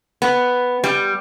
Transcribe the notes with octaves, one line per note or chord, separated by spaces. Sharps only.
B3
G3